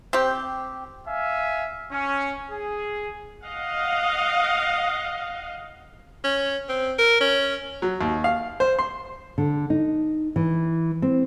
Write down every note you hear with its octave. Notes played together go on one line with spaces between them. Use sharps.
C4 G4
E5 F5 G#5
C#4
G#4
D#5 F5 F#5
C#4
C4
A#4
C#4
F#3
D#2
F5
C5
C6
D3
D#4
E3
C4